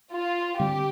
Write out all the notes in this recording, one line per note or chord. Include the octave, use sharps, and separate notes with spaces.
F4
D3 G3 C4 G4